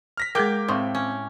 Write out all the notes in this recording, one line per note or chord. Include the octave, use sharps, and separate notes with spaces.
F6 A#6 B6
G#3 A#3 G#4 A#4 G5 D6 G6
A2 C4 F5 C6 C#6 D#6
C#4